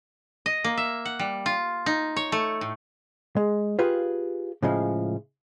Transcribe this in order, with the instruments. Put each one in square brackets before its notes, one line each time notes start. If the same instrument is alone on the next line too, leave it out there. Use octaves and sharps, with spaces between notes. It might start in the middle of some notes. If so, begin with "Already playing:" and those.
[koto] D#5
A#3
E5
F#5
G3
F4
D#4
C#5
A3
A2
[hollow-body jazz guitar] G#3
F4 G4 G#4 B4 F5
A2 C#3 F3 G#3